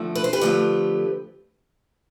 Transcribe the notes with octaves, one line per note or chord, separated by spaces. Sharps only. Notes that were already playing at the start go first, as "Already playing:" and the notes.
Already playing: D3 F3 A3 C4
B4
C5
G4 B4
D3 F3 A3 C4